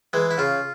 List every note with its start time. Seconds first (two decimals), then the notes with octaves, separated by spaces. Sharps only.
0.13 E3 G#3
0.31 E4
0.38 C#3 F4